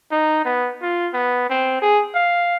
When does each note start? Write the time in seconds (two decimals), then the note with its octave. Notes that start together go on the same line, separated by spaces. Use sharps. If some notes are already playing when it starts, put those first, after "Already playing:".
0.11 D#4
0.45 B3
0.82 F4
1.13 B3
1.50 C4
1.82 G#4
2.15 F5